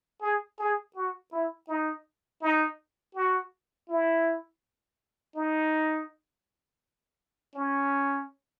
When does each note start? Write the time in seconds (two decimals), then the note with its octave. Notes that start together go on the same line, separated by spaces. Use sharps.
0.22 G#4
0.59 G#4
0.96 F#4
1.32 E4
1.68 D#4
2.42 D#4
3.15 F#4
3.89 E4
5.35 D#4
7.55 C#4